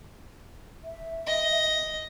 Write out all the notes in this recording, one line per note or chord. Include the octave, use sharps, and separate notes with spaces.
E5
D#5